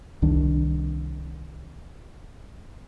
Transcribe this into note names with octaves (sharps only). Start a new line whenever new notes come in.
C2 D#3 D4